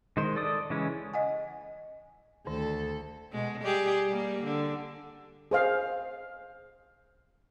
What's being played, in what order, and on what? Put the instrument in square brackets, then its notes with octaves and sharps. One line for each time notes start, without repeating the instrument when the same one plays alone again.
[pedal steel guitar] D#3 G#3 C5
A4 D5 D#6
C#3 E3 G#3 C#4
[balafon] D#5 F#5 G#5
[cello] D2 A4 [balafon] D#3
[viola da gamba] B2 G#3
G3 G4 G#4
G3 A#3
D3
[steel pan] G#4 C5 F5